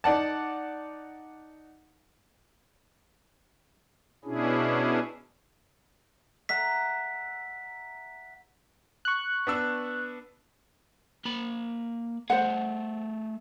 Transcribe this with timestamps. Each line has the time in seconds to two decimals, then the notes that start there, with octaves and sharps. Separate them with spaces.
0.04 D#4 D5 F#5 A5
4.25 B2 C#4 D4 E4 G#4
6.49 E5 F#5 A#5 B6
9.05 C#6 F#6
9.47 B3 D4 E6
11.25 A#3 B5
12.30 A3 G#4 C5 F#5